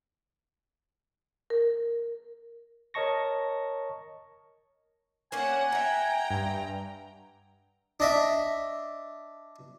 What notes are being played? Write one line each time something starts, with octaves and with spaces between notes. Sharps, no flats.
A#4
A#4 C#5 D#5 A5 C#6 A#6
A#3 C#4 D4 F#5 G#5
E5 F#5 G5 A#5
G2
D4 D#5 E5